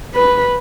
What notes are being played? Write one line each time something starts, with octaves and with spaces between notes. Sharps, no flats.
B4